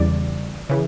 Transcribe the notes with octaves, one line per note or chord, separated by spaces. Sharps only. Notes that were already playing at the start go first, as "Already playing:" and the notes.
Already playing: E2 C#3 E3 G3 D5
C#3 E3